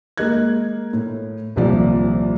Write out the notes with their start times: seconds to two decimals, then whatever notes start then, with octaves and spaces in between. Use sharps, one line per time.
0.17 G#3 A#3 G#4 D#5 F#6 G#6
0.93 A2
1.56 D#1 C2 F3 D5